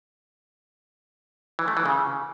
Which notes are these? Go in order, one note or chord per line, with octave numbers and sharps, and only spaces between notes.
E3
A3
E3
C#3